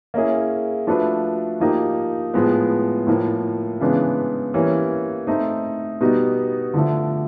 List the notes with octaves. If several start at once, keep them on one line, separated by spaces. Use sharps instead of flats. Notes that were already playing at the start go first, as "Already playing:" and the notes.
A#3 C#4 E4 G#4
F3 A3 D4 F#4 B4
F3 A#3 D#4 G4
A2 F3 G#3 B3
A2 F3 A#3
C#3 E3 G#3 B3 D4
E3 G3 A#3 C#4
A3 C4 D#4
B2 G3 B3 D#4 F#4
D3 F3 A3